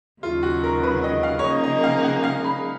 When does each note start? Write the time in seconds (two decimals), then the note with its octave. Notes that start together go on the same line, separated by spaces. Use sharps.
0.23 D#2 C#3 F#3 F4
0.43 F#4
0.64 A#4
0.83 B4
1.04 D#5
1.23 F5
1.39 C#5
1.43 C#3 F3 A#3 D#4 G#4 D#5
1.64 D#5
1.84 F5
2.04 F#5
2.24 F5
2.44 B5